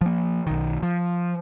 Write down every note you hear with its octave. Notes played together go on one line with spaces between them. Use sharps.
F3 A#3
B1 D#3
F3